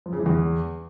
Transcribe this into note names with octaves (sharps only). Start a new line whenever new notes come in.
F3
C#3
E3
E2